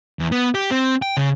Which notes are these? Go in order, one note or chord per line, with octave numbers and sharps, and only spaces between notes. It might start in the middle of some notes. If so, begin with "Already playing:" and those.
E2
B3
G4
C4
G5
C#3